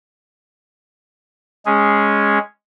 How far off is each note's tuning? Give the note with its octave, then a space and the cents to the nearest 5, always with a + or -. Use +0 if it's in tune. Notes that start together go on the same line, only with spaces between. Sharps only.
G#3 +0 C#4 +0 G#4 +0